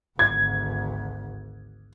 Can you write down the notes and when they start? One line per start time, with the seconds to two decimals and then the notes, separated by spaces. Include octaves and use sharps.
0.19 G#1 D2 G#6